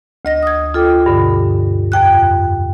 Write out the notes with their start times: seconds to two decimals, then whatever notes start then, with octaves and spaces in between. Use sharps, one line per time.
0.25 D2 D#5 A#6
0.43 D#6 G#6
0.74 F4 A4 G5 D6
1.06 G2 B2 D3
1.92 F2 G5 F#6